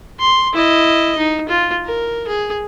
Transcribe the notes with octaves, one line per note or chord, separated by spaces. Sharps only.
C6
E4 D#5
D#4
F4
A#4
G#4